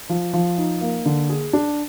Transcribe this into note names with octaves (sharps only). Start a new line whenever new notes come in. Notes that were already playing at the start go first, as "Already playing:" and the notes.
F3
F3
D#4
A#3
D3
G#4
D4